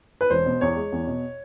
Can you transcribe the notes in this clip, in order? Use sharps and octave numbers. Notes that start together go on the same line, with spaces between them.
B4
E1 C5
B2
E2 C#5
G#3
E2
B2